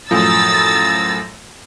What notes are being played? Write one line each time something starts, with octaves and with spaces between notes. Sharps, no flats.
F#2 A2 F3 A#5 D#6 E6 A6